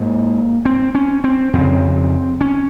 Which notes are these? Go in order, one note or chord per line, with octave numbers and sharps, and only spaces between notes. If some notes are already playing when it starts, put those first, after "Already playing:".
Already playing: G#2 A#3
C4
C#4
C4
F2 C#3 C4
C#4